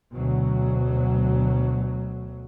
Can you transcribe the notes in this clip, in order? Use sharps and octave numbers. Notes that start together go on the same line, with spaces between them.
D2 B2 F#3